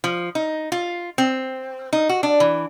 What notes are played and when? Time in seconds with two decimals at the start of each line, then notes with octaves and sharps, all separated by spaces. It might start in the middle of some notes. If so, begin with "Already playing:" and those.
0.04 F3
0.35 D#4
0.72 F4
1.18 C4
1.93 D#4
2.09 F#4
2.23 D4
2.40 E3